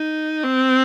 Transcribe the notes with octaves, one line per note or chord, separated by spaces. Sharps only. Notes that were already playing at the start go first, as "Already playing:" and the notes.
Already playing: D#4
C4